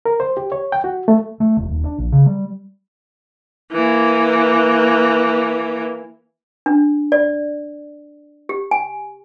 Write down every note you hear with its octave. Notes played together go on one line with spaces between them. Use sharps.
A#4
C5
G4
C#5
G5
F#4
A3
A3
E1
D#1
D4
A#1
C#3
G3
E3 A#3
D4
D5
G4
G#5